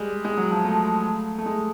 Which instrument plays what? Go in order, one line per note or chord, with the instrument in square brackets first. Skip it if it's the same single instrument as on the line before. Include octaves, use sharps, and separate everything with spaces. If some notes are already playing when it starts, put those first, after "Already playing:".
Already playing: [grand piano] G3 G#3
G#3
F#3
F3
A3
A3
G#3